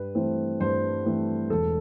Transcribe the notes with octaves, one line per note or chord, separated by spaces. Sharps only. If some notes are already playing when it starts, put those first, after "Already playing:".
Already playing: G2 B4
E3 A3 C4
G2 C5
E3 A3 C4
E1 A4